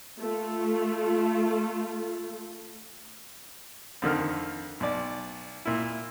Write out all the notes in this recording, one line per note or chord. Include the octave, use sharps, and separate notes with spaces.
A3 F4
F2 D3 D#3 F6
B1 D5
A#2 E4